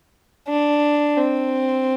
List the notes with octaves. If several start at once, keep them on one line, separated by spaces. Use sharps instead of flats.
D4
C4